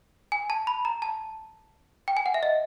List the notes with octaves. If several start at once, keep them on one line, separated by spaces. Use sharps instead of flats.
G#5
A5
B5
A#5
A5
G5
G#5
F#5
E5
D#5